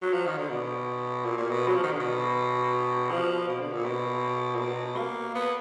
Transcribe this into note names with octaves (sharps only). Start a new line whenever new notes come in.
F#3
F3
D#3
D3
B2
A#2
A#2
B2
F#3
F3
D#3
D3
B2
F3
B2
D3
A#2
B2
A#2
B2
A#3
B3